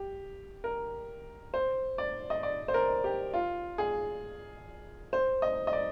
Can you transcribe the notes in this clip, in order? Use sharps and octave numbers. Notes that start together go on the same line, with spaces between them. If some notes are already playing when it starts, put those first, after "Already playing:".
Already playing: G4
A#4
C5
D5
D#5
D5
C5
A#4
G4
F4
G#4
C5
D#5
D#5
D5